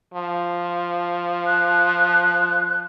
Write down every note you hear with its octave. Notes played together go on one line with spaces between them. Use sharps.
F3
F#6